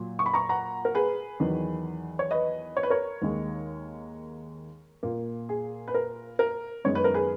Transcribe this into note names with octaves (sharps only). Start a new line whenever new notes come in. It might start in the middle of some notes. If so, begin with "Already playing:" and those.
Already playing: A#2 F#3
C#6
B5
A#5 C#6
F#5 A#5
A#4
G#4 B4
E2 D#3 F#3 B3
C#5
B4 D#5
C#5
B4
A#4 C#5
D#2 D#3 G#3
A#2 A#3
G#4
B4
A#4
A#4
F#2 D#3 G#3 B3 C#5
B4
A#4
G#4 B4